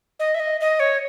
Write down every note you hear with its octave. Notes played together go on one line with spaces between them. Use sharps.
D#5
E5
D#5
D#5
C#5